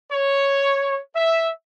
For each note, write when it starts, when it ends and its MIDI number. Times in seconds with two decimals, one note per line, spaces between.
0.11 0.98 73
1.15 1.50 76